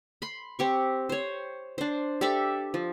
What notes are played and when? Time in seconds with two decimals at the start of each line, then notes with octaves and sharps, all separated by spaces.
0.22 B5 C6
0.59 C4 G4 C#6
1.09 C5 C#5
1.78 D4 C5
2.21 G4 A4 D5 E5
2.74 F3